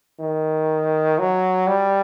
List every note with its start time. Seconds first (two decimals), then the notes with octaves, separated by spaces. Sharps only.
0.20 D#3
1.19 F#3
1.68 G3